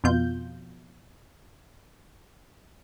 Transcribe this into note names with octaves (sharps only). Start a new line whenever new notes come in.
F2 B2 F4 G6